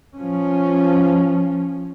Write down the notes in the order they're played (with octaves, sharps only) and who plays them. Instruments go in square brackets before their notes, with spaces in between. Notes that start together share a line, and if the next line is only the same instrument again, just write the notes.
[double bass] F3 C#4